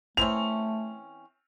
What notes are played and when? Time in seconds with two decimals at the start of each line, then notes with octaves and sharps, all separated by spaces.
0.17 E3 A3 C4 C#4 F7